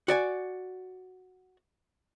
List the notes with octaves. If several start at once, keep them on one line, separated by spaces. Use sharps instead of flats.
F#4 D5 G#5